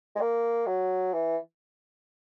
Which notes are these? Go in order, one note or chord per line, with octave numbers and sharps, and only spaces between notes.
G#3
A#3
F#3
E3